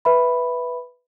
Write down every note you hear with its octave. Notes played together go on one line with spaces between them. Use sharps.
B4 E5 B5